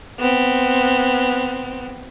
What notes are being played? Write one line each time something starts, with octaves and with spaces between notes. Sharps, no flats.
B3 C4